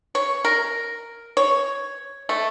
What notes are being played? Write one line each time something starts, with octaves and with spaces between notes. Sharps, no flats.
C#5
A#4
C#5
A3